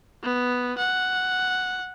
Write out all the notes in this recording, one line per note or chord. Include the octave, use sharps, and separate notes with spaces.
B3
F#5